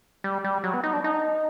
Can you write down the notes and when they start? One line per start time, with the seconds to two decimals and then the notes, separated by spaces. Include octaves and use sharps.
0.24 G3
0.44 G3
0.64 F#3
0.74 B3
0.84 D#4
0.93 D4
1.04 D#4